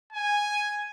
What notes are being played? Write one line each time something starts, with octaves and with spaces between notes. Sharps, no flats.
G#5